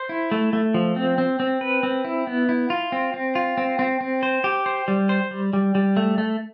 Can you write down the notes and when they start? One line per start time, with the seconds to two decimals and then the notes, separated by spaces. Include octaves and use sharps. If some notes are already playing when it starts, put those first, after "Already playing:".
Already playing: C5
0.09 E4
0.32 A3
0.53 A3
0.74 F3
0.96 C4
1.18 C4
1.40 C4
1.61 B4
1.83 C4
2.05 E4
2.27 B3
2.49 E4
2.70 F4
2.92 C4
3.14 C4
3.35 F4
3.57 C4
3.79 C4
4.01 C4
4.23 C5
4.44 G4
4.66 C5
4.88 G3
5.09 C5
5.31 G3
5.53 G3
5.75 G3
5.97 A3
6.18 A3